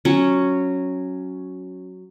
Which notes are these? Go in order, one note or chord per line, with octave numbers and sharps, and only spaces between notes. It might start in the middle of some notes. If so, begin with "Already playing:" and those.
F#3 C#4